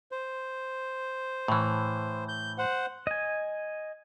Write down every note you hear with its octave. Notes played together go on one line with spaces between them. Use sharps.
C5
A2 E3
G6
C5 F#5
D#5 G#5